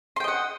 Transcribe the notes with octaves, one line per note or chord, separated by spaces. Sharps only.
D#5 F#5 G5 C6